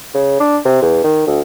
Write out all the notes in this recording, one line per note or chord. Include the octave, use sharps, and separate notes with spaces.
C#3
D4
C3
E2
D#3
D2